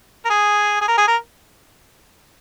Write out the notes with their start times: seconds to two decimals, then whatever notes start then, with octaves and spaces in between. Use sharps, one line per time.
0.25 A#4
0.30 G#4
0.81 G#4
0.88 A#4
0.98 G#4
1.07 A#4